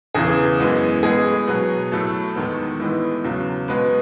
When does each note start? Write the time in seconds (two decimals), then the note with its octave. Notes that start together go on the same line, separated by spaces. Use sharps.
0.14 E2 C#3 E3 G#4
0.59 F#2 E3 G#3 B3
1.03 A2 G#3 B3 G#4
1.47 B2 F#3 B3
1.92 A2 F#3 A3 A4
2.35 E2 D#3 G#3 B3
2.80 A2 E3 G#3 B3
3.24 E2 C#3 F#3
3.68 B2 G#3 B3 B4